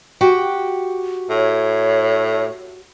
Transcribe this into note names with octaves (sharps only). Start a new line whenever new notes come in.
F#4 G4 G5
A2 C#5